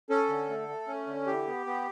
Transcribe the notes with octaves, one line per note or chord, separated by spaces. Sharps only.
C#4 A4
D3
A3
A3
C#4
D3
E3 G4
B3
B3